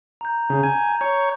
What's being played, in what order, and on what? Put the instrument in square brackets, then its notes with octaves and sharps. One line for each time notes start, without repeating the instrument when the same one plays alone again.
[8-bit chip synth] A#5 G6
[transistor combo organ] C#3
G#5
C#5